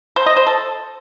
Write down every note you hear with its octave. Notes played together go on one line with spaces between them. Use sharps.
C5
D#5
C5
A4